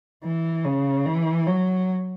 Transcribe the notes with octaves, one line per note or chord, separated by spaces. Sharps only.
E3
C#3
E3
F#3